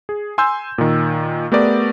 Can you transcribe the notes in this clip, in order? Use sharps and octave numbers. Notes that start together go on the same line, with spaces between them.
G#4
G#5 C6 E6 G6
A#2 D#3
A3 B3 G4 A#4 D5